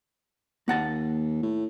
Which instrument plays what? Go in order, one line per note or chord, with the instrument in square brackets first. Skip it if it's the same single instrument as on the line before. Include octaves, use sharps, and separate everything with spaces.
[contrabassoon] D#2 [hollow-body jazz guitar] A#3 F#5 A5
[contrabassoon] A2